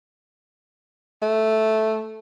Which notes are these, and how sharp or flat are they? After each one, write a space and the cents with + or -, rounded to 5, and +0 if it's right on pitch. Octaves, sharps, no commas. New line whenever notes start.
A3 -5